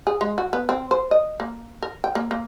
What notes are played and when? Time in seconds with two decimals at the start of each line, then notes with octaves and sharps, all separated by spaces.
0.07 G#4
0.21 G#3
0.38 F#4
0.53 B3
0.69 C4
0.91 C5
1.11 D#5
1.40 A#3
1.83 A#4
2.04 G5
2.15 A#3
2.31 A#3